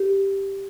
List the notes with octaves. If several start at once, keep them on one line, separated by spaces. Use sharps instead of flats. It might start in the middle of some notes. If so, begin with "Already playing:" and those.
Already playing: G4